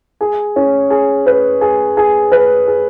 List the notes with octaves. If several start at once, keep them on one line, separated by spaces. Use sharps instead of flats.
G#4
C#4
G#4
B4
G#4
G#4
B4
G#4